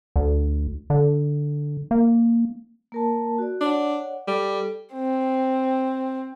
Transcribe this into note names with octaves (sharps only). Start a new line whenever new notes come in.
D2
D3
A#3
A#3 A#4 A5
F#4 D5
D4 C#5 D5 F#5
G3 A4
C4